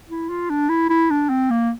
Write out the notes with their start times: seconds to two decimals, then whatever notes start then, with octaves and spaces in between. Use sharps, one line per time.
0.09 E4
0.30 F4
0.50 D4
0.69 E4
0.90 E4
1.10 D4
1.30 C4
1.51 A#3